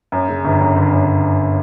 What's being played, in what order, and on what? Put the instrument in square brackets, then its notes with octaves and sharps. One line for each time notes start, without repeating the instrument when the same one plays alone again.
[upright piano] F#2
C#3
G1
F#2
G1
F#2